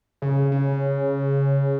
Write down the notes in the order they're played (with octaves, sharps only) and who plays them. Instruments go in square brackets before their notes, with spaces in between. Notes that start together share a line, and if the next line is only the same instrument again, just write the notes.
[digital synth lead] C#3
C#3